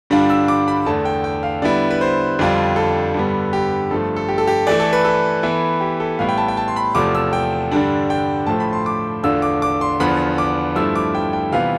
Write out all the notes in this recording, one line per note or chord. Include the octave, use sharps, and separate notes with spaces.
G2 D3 G3 D4 F4
E6
D6
B5
E2 D3 A3 A5
G5
G5
F5
D3 G3 B3 E4 D5
B4
C5
F2 D3 G3 D4 F4
A4
G2 D3 G3 B3
G4
G2 F3 A3 A4
A4
G4
A4
G4
E3 A3 E4 D5
A4
B4
A4
E3 B3 E4
G4
A4
A2 G3 B3 E4 F5
G5
A5
G5
A5
C6
B5
E2 C3 F3 A3 D6
E6
G5
G2 D3 G3 D4
G5
A2 F3 A3 A5
B5
C6
D6
E2 D3 A3 D4 F4 E6
D6
D6
C6
E2 D3 F3 B3 B5
D6
G2 F3 A3 E4 E6
D6
G5
G5
C3 E3 G3 B3 F4 F5